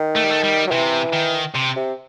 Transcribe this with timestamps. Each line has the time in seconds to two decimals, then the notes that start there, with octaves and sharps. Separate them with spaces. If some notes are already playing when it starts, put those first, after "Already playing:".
Already playing: D#3
0.16 A3
0.24 G3
0.31 A3
0.44 G3
0.67 F#3
0.71 C3 E3
1.13 D#3
1.55 C3
1.76 C3